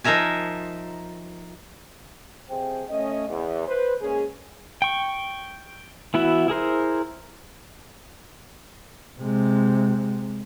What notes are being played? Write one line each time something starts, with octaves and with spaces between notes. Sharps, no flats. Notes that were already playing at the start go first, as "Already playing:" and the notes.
F3 D#4 A#4 E5 G#5
F2 C3 G#4 C5 G5
A3 C#4 D#5
E2
B4 C5
G#3 A#3 C#4 G#4
G5 C#6
E3 B3 E4 F#4 E5
E4 G#4 A#4 C5
C3 G#3